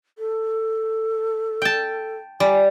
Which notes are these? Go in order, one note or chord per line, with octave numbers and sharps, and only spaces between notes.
A4
G5 A5
G3 G#5